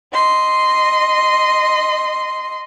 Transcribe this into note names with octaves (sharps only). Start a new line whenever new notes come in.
D#5 C6